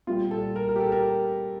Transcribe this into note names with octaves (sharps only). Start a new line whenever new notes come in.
A#2 G3 F4
A4
A#4
A#4
G4
A4
A#4